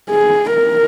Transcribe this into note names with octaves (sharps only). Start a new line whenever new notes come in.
G#4
A#4